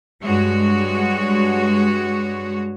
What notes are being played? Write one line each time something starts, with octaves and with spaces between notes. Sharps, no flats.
G2 G#3 F#4 C#5